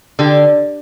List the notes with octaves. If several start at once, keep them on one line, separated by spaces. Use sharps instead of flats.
D3 G4